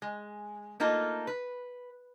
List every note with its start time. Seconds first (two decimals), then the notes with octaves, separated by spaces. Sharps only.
0.02 G#3
0.80 A3 A#3 D#4 F4 A4
1.27 B4